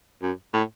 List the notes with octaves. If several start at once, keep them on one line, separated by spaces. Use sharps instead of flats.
F#2
A2